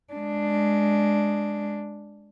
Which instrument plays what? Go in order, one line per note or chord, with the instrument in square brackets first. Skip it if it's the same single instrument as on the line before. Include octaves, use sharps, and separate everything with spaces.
[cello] G#3 D4